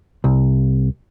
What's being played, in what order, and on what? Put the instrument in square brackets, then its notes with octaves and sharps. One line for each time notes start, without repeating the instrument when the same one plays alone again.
[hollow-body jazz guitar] C2